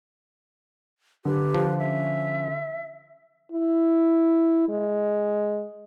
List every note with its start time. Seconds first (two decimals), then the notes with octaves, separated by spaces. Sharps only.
1.25 D3 G4 B4
1.54 F3
1.79 C#4 E5
3.52 E4
4.69 G#3